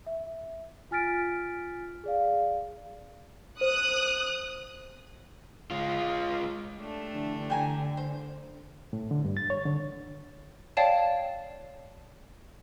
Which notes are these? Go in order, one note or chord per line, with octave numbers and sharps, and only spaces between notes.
E5
F4 G#5 F6 A6 B6 D7
G#4 D5 F5
C5 D#6 F#6
G#3 F4
A3 D4 G4
D3 E3
D3 G5 G#5 A#5
C5
A2
D3
G2
A6
C#5
D3
C#5 D5 F5 G5 A5